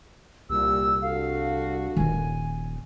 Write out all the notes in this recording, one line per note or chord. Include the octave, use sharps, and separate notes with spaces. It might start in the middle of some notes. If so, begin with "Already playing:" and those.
C2 A#2 G4 E6
D4 F#4 A4 F5
D#1 D#3 F4 G#5